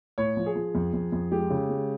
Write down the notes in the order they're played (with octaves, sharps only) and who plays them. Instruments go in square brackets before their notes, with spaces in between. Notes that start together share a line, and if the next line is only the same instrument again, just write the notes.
[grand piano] A2 C#5
F3
G#4
F3
F2
F2
F2
G#3 G4
C#3
G#3